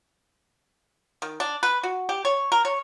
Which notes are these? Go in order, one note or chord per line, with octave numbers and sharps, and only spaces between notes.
D#3
D4
B4
F#4
G4
C#5
A#4
C#5